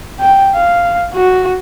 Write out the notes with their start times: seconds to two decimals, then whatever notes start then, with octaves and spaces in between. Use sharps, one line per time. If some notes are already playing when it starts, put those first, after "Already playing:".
0.19 G5
0.55 F5
1.13 F#4